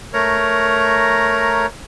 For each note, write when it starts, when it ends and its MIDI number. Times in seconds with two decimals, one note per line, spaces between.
0.14 1.66 57
0.14 1.66 70
0.14 1.66 73
0.14 1.66 82